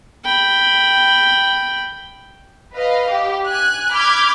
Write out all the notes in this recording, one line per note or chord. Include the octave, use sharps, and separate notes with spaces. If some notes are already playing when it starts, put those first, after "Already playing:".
G5 B5
B4 D#5 F5
G4
G#5 F#6
B5 D6 F6 G6 G#6